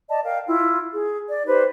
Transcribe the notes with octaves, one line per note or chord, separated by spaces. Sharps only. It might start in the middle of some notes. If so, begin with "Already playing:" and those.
D5 D#5 A5
A#4 F5 G5
E4 F4
G#4
D5
D#4 G4 B4 C5